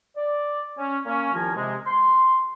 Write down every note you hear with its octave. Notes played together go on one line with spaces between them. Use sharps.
D5
C#4
A#3 C#4
C2 D#3 F3 F4 A#4 G#5
C3 G#3
C6